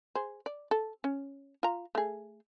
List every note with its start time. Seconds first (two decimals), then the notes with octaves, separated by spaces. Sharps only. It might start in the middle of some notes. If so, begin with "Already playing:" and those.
0.15 G#4 C5
0.46 D5
0.71 A4
1.04 C#4
1.63 F4 A#5
1.95 A3 G#4